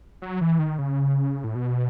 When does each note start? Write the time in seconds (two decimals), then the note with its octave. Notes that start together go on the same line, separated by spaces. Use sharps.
0.22 F#3
0.41 E3
0.59 D#3
0.78 C#3
1.44 A2
1.55 B2